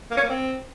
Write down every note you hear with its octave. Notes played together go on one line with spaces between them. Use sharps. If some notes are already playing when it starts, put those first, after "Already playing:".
A#3
C#4
A#3
C4